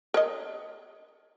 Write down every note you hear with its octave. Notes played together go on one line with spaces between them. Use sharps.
A#4 C#5 D#5